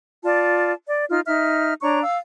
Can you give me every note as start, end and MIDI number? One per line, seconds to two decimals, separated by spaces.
0.24 0.72 65
0.24 0.72 74
0.24 0.72 81
0.85 1.05 74
1.10 1.20 63
1.10 1.20 65
1.10 1.20 89
1.26 1.74 63
1.26 1.74 76
1.26 1.74 89
1.81 2.00 62
1.81 2.00 73
1.81 2.00 82
1.81 2.00 85
2.02 2.17 77
2.02 2.17 88